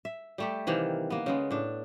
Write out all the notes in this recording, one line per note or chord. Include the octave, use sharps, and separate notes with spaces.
E5
G3 A3 G4
C3 D#3 E3 A#3
A#3 B3
C#3 G#3 B3
A2 D4